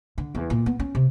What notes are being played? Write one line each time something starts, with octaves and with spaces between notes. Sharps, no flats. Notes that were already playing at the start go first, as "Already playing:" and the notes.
D3
E2
A#2
B3
C#4
C3